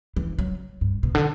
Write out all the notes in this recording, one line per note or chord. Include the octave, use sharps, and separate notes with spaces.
E3
F#3
G2
B2
D3